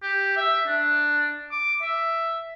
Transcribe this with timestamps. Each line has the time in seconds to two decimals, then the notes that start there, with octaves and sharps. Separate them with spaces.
0.03 G4
0.37 E5
0.67 D4
1.52 D6
1.82 E5